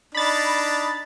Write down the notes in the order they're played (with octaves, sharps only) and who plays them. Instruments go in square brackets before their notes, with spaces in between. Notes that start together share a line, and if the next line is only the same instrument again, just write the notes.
[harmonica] D4 D#4 [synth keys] B5 A6